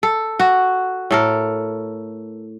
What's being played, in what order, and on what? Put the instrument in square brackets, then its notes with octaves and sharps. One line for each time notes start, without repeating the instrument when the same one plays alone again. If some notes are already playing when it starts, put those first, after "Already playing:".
[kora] A4
F#4
A2 A4 A#4